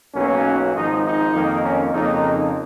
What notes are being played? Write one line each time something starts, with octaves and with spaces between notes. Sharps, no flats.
B1 B2 F#3 A#3 C#4
G#1 G#2 F3 D#4
D#4
F2 D#3 A#3
C#4
F2 C#3 F3 A#3 D#4